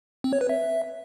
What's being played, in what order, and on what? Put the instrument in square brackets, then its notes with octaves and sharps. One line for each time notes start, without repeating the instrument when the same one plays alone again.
[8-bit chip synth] C4
C#5
B4
E5